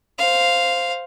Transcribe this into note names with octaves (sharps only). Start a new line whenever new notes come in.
C5 F5